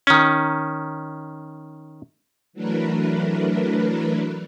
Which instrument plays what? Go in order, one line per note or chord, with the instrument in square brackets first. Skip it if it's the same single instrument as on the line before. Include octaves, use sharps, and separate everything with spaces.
[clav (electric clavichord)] D#3 C#4
[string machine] E3 F#3 A3 D4 A#4 B4